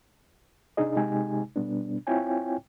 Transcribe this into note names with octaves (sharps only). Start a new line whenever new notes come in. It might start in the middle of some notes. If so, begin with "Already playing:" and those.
C3 D4 D#4 G#4 D#5
C3 G#3 D#4 G4 G#5
B2 G3 B3 D4
C4 E4 F4 C#5 G5 G#5